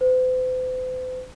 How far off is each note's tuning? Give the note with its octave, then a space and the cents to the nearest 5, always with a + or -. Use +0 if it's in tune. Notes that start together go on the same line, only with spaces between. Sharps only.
C5 -45